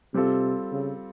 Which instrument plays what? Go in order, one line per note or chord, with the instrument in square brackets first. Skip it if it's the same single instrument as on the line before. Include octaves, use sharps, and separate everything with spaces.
[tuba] C3 [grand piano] G3 C4 F4 A4
[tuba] C#3